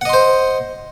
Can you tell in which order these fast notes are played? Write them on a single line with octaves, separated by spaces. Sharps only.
F#5 D#5 C6 C5